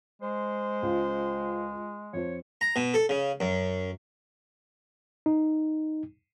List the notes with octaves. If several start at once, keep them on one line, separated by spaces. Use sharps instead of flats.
G#3 C5
C#2 F4
F2 C5 C#5
A#5
B2
A4
C#3
F#2
D#4